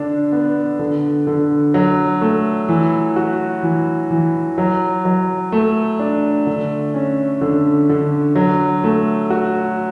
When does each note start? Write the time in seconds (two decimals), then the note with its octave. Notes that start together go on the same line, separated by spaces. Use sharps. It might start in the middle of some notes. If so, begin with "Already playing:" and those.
Already playing: D3 D4
0.32 B3
0.79 D3
1.27 D3
1.74 F#3
2.21 A3
2.69 E3
3.16 F#4
3.63 E3
4.11 E3
4.58 F#3
5.05 F#3
5.52 A3
6.00 D4
6.47 D3
6.94 C#4
7.41 D3
7.89 D3
8.36 F#3
8.84 A3
9.30 F#4